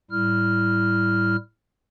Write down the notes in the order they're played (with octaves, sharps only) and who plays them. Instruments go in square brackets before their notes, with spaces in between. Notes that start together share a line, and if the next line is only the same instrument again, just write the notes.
[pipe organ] A2 G3 E4 F6